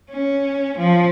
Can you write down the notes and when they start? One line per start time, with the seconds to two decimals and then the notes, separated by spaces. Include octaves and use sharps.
0.10 C#4
0.78 F3